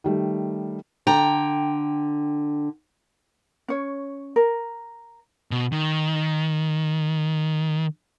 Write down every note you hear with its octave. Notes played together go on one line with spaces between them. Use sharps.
D#3 G3 A3
D3 G5 A#5
C#4 C#5
A#4
B2
D#3